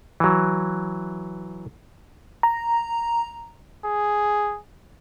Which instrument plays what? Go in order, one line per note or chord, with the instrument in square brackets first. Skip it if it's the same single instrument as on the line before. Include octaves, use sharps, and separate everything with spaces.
[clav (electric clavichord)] E3 F#3
[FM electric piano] A#5
[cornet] G#4